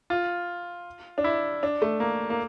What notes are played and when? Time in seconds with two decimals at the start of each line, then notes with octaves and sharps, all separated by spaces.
0.10 F4
1.18 D4
1.24 E4
1.63 D4
1.82 A3
2.00 A#3
2.30 A#3